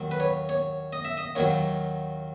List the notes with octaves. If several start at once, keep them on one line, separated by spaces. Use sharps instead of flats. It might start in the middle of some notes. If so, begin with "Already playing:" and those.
Already playing: D#2 D#3 F#3
B4
C#5
C#5
D#5
E5
D#5
D#2 D#3 F#3 C#5